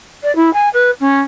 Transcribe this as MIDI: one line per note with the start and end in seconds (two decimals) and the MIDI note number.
0.23 0.34 74
0.35 0.52 64
0.53 0.69 80
0.73 0.90 71
1.00 1.19 61